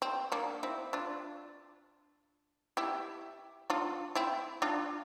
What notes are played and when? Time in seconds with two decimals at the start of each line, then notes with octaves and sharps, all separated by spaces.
0.02 C4
0.32 A#3 D4
0.63 C4 E4
0.93 D4 F4
2.77 E4 G4
3.70 D4 F4
4.15 C4 E4
4.62 D4 F4